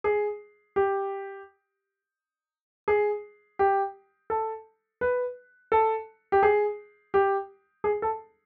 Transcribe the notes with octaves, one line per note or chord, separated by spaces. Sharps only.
G#4
G4
G#4
G4
A4
B4
A4
G4
G#4
G4
G#4
A4